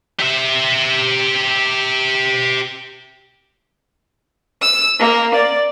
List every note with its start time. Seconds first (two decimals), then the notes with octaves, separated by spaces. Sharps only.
0.20 G4 E5
4.61 E6
4.99 A#3
5.35 D5